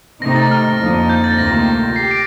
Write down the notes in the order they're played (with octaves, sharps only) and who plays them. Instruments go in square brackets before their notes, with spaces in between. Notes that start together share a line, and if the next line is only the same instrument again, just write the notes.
[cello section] C3 D#3 A3 D#4 [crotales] A#6
[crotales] A6
F6
[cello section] F2 D3 F3 A#3 D#4
[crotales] G6
A6
[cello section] D2 C3 D#3 A#3 F4 [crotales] A#6
[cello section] G4 [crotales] C7
[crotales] A#6 D7